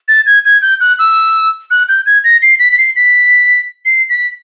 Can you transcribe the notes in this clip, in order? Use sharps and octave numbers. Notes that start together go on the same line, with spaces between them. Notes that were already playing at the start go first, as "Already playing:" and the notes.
A6
G#6
G#6
G6
F#6
E6
F#6
G6
G#6
A#6
C7
B6
B6
C7
B6
C7
B6